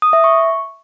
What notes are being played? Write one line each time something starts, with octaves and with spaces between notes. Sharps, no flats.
D#6
E5
C#6